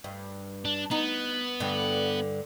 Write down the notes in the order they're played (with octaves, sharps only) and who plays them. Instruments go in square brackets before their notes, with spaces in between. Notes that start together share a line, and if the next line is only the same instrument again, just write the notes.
[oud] G2
[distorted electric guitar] D4
[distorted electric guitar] B3 [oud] D#4
[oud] G2 D3